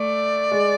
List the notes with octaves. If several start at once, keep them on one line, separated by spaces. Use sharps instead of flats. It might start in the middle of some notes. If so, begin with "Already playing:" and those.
Already playing: A3 D5
G#3